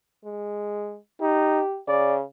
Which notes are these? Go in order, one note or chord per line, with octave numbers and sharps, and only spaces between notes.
G#3
D#4 G4
C#3 D5